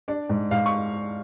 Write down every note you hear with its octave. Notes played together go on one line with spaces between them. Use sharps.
D4 D5
G#2
G#2 F5
C#6